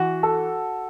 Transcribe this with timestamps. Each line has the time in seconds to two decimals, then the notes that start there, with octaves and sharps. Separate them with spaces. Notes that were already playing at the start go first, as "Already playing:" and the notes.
Already playing: E3 F#4
0.23 A4